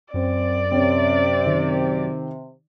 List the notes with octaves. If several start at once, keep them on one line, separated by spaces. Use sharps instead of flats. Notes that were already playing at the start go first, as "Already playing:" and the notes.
F#2 C4 D5
C3 C4 C#4
D#3